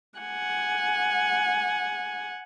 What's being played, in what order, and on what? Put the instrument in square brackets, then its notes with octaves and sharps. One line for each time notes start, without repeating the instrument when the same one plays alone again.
[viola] F#5 G#5